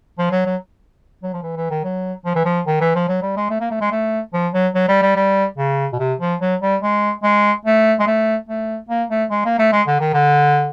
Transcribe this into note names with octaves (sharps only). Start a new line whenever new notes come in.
F3
F#3
F#3
F#3
F3
E3
E3
D#3
F#3
F3
E3
F3
D#3
E3
F3
F#3
G3
G#3
A3
A#3
A3
G#3
A3
F3
F#3
F#3
G3
G3
G3
C#3
B2
C3
F3
F#3
G3
G#3
G#3
A3
G#3
A3
A3
A#3
A3
G#3
A#3
A3
G#3
D3
D#3
D3